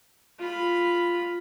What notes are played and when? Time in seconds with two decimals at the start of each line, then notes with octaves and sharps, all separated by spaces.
0.39 F4 B5